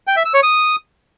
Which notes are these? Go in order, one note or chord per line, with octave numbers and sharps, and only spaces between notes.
G5
E5
E6
C#5
D#6